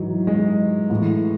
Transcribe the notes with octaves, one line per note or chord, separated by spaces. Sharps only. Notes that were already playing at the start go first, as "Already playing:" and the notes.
Already playing: G#2 E3 F#3
G#3
A2 E3